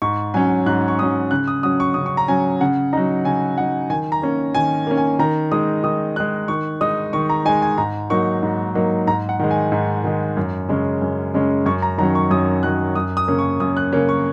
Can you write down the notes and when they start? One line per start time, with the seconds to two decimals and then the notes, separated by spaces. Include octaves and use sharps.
0.02 G#2 C#6
0.34 F#3 C#4 G#5
0.66 G#2 F#6
0.88 C#6
0.99 F#3 C#4 D#6
1.31 C#3 F#6
1.47 D#6
1.63 F#3 C#4 D#6
1.80 C#6
1.94 C#3 D#6
2.06 C#6
2.17 A#5
2.28 F#3 C#4 G#5
2.61 C#3 F#5
2.93 F#3 D#4 A#5
3.25 C#3 G#5
3.57 F#3 D#4 F#5
3.90 D#3 G#5
4.12 A#5
4.22 A#3 C#4
4.54 D#3 G#5
4.87 A#3 C#4
4.97 G#5
5.19 D#3 A#5
5.52 G#3 D#4 D#6
5.84 D#3 D#6
6.16 G#3 D#4 F#6
6.48 D#3 C#6
6.81 G#3 D#4 D#6
7.13 D#3 C#6
7.30 A#5
7.45 D#4 G#5
7.49 G#3
7.62 G#5
7.78 G#2 A#5
8.10 F#3 A#3 D#4 C#6
8.43 G#2
8.75 F#3 A#3 D#4
9.07 G#2 A#5
9.29 F#5
9.39 D#3 G#3
9.51 G#5
9.72 G#2
10.04 D#3 G#3
10.37 F#2
10.69 C#3 G#3 C#4
11.02 F#2
11.34 C#3 G#3 C#4
11.66 F#2 C#6
11.82 A#5
11.98 D#3 F#3 C#4 A#5
12.15 C#6
12.31 F#2 D#6
12.63 D#3 F#3 C#4 F#6
12.95 F#2 D#6
13.17 D#6
13.28 C#3 A#3 C#4
13.39 C#6
13.60 F#2 D#6
13.77 F#6
13.92 C#3 A#3 C#4
14.09 C#6